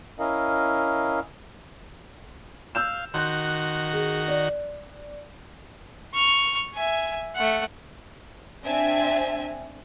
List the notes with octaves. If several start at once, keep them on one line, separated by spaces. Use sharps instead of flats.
C#4 E4 A#4 D#5 F5
F5 E6 G6 E7
D#3 F#4 C6 F#6
G#4
D5
C#6 F6
E5 G#5
A3 F#5
C4 D4 E5 G#5